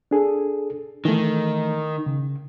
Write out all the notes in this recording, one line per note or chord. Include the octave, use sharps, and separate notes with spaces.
D4 G#4 A4
D#3 E3 A3
C#3